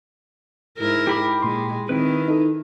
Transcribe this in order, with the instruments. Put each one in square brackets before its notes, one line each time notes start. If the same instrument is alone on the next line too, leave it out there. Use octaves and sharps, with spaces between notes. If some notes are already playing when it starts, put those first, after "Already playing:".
[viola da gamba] G#2 E4 A#4
[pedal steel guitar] G4 B5 D6
[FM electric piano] A#2 C6 [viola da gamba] G#3
[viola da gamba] D#3 [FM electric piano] C4 [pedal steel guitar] E4 B4
[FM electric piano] D#4 A4